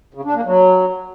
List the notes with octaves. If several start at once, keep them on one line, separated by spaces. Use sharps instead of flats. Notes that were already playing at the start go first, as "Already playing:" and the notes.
C#3
D4
A#3
F#3